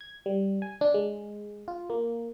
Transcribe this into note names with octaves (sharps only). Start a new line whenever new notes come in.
G#6
G3
G#5
D4
G#3
F4
A#3